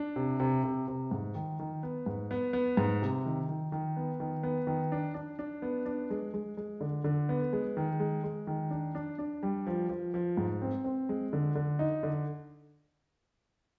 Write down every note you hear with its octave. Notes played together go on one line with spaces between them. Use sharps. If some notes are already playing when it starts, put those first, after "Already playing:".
Already playing: D4
C3
C3
C3
C3
G#2
D#3
D#3
B3
G#2
B3
B3
G#2
C3
D#3
D#3
D#3
B3
D#3
B3
D#3
D4
D4
D4
B3
D4
G#3
G#3
G#3
D3
D3
B3
G#3
D#3
G#3
G#3
D#3
D4
D4
D4
G3
F3
F3
F3
G#2
C4
C4
G#3
D3
D3
D#4
D3